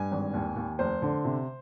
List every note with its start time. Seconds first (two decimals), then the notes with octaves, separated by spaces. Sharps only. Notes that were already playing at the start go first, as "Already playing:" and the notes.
Already playing: G2 G#5
0.12 G#1
0.34 D#2
0.56 D#2
0.79 F1 C5
1.02 D3
1.25 C3